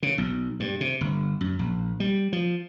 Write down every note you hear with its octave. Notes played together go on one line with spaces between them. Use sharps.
C#3
B1
G2
C3
G1
F#2
A#1
G3
F3